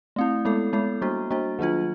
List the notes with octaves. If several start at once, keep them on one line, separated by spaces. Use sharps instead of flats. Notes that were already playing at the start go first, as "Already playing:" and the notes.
A3 C4 E4
G#3 B3 E4 A4
G#3 B3 E4 A4
G3 A#3 D4 F#4
G3 A#3 D4 F#4
D#3 F#3 A#3 D4 F4